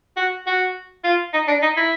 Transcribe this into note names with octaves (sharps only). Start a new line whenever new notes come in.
F#4
F#4
F4
D#4
D4
D#4
E4